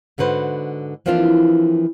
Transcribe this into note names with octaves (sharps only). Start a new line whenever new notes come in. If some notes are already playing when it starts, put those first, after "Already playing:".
G#2 D3 F#4 B4 C5
E3 F3 A#3 C4 D4 F4